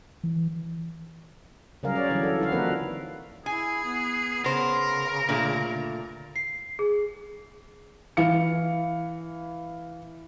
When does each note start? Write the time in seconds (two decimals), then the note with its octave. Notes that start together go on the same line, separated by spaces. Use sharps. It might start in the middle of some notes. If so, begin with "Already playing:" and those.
0.24 E3
1.83 C#3 F#3 G3 G#4 A#4 F5
1.96 C#5 D5
2.09 D3 E3 F#3 G3
2.23 A4
2.40 E4 F#4 F5
2.51 F3 A#3 C4 D#4 A#4 B4
3.46 E4 G#4 G#5
3.85 B3
4.44 C#3 B3 A#4 C5
5.29 A#2 D3 A3
6.36 C7
6.79 G#4
8.17 E3 F5 C#7